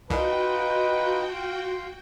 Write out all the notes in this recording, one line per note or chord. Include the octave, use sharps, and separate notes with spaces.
C2 D#4 F4 F#4 B4 G5 A5
F4 F5